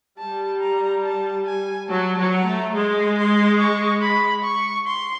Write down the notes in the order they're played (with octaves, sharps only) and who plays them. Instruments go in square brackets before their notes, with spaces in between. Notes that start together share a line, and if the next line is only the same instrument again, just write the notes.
[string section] G3 [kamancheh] A5
[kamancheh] A#5
A5
G#5
[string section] F#3 [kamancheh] A5
[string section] F#3
[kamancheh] A#5
[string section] A3
[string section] G#3 [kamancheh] C6
[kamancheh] C6
C#6
B5
C#6
C6